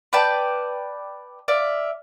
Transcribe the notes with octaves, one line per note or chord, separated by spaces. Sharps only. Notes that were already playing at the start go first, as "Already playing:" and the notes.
B4 D5 G5 A5
D5 E5 F5